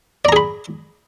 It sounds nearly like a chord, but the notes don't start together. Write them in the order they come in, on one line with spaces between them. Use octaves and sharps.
D5 A#5 G#4 B5